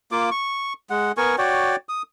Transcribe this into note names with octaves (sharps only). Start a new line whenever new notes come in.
A#3 F4 D6
C#6
G#3 F#5
B3 A#4 G#5 C#6
F#4 C#5 D5 G5
D#6